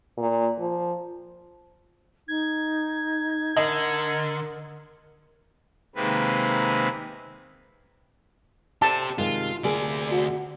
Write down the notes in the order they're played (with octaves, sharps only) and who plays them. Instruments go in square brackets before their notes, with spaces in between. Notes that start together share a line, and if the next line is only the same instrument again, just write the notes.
[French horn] A#2
F3
[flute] D#4 [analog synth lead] G#6
[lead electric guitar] D3 [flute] A#4 [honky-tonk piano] D#5
[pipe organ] C3 D#3 G#3 A#3 C4 B4
[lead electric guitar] G4 C5 [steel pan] A5
[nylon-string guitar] C3 D#3 G#3 [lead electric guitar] F4
[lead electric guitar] D2 D5 [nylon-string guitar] C3 A#3 G#4
[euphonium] F#4